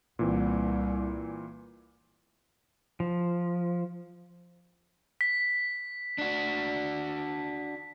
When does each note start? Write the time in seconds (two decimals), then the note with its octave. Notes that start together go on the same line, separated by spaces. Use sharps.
0.19 C2 A#2 E3 C4
3.00 F3
5.21 B6
6.18 D4 F#4